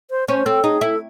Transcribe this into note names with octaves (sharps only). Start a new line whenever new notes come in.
C5
C#4 C5
C4 A4
D#4 G#4
E4 A4